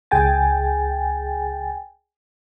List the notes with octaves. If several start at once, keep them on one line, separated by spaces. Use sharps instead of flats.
C#2 G#4 G5 G#5 A6